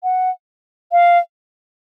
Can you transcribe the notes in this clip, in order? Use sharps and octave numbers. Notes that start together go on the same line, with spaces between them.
F#5
F5